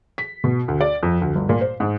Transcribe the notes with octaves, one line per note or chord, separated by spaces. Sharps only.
B6
B2
D2
D5
F2
D2
G1
A#2
C5
G#2